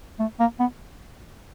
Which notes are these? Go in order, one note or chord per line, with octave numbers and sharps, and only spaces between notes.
A3
A#3
B3